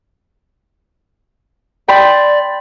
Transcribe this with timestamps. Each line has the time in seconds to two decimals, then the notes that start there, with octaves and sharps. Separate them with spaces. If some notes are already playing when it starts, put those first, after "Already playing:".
1.88 D5 G5 B5 C6